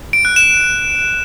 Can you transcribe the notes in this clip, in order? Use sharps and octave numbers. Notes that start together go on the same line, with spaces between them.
D7
F#6
E7